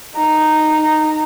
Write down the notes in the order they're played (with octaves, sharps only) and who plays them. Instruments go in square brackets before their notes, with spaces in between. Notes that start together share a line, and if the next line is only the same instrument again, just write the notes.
[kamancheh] D#4 A#5